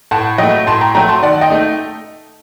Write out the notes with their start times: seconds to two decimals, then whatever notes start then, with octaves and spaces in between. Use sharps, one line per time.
0.11 A2 F#5 A5
0.38 F#3 A3 D#5 G5
0.67 A2 A5 C6
0.81 G5 A#5
0.95 F#3 A3 G5 A#5
1.08 A5 C6
1.23 D#3 D5 F#5
1.41 D#5 G5
1.50 A3 D#4